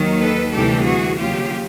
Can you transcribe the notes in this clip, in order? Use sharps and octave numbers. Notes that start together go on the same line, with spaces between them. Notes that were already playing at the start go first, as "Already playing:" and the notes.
Already playing: D#2 D#3 F#3
A4 B4
D2 C3 E3 G3 G4 A4
F#4 G#4
D#2 C#3 F#3 A#3 F4 G4